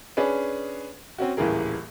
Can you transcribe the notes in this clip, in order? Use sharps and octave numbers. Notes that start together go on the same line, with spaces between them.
C#4 D4 G#4 B4
C4 C#4 F#4
D#1 C#2 A2 E3 G#4 A#4